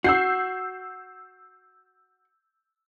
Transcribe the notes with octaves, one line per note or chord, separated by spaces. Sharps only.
F#4 E6 G6 C7